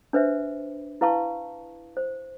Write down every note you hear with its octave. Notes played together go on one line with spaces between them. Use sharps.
D4 B4 C5 E5
E4 B4 F5 A5 C#6
C5